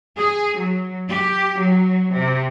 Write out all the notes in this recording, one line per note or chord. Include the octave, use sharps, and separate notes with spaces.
G#4
F#3
G4
F#3
C3